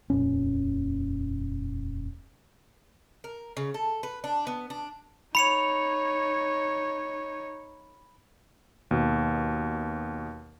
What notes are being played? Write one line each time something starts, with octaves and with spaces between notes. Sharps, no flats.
D#1 F2 A#2 C#4
A#4
C#3
A4
B4
D4
B3
D4
D#4 C#5 B5 C#7 F7
D#2 B2